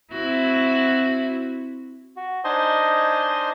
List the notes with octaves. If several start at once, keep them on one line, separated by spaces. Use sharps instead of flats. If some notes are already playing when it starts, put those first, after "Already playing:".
C4 E4 F#4
F#4
D4 D#4 C5 D#5 G#5 C6